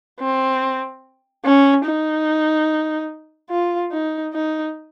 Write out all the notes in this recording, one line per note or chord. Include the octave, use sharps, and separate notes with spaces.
C4
C#4
D#4
F4
D#4
D#4